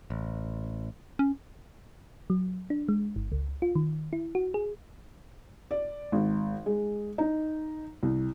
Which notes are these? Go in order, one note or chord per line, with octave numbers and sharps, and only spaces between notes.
A1
C#4
F#3
D4
G#3
G1
C#2
F4
D#3
E4
F#4
G#4
D5
G#1
G#3
D#4
C2